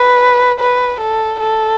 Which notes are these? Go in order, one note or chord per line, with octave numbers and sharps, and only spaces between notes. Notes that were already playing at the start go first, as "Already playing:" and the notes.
Already playing: B4
B4
A4
A4